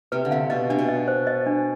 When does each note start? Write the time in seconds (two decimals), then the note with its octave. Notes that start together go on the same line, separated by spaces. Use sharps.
0.12 C3 B4
0.25 D3
0.31 C3 F5
0.50 B2 D#5
0.70 C3 D4
0.79 B2
0.89 D#5
1.08 C5
1.27 D#5
1.46 D4